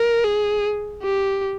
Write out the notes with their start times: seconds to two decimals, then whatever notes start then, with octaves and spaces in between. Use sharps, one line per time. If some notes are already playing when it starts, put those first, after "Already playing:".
Already playing: A#4
0.24 G#4
1.03 G4